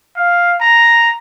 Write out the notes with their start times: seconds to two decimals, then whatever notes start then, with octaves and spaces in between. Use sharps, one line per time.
0.17 F5
0.61 A#5